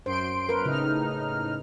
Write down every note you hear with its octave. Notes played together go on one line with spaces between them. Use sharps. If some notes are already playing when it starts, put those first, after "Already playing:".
F#2 C5 C6 D7
A#4 B4
A2 C#3 D#4 F6